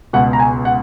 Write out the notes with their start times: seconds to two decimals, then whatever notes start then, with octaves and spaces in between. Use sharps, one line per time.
0.13 C#2 B2 F#5
0.33 A#5
0.39 G#5
0.65 F#5